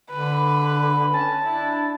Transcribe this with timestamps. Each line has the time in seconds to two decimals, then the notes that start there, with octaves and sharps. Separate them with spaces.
0.12 D3 B4
1.14 C#4 A5
1.45 D4 E4